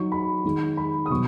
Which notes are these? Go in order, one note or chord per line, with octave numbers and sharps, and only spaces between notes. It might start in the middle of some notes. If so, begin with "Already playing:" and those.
Already playing: F#3 D#4 C#6
B5
D#3 G#3 D#4
B5
D#6
B2 F#3 C#6